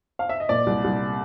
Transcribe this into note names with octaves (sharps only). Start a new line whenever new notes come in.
F5
E5
D#5
A#2 D5
C2
C2